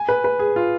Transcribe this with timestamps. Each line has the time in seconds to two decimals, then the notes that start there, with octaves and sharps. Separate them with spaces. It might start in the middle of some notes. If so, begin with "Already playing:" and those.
Already playing: G#5
0.09 B4
0.24 B4
0.39 G#4
0.56 F4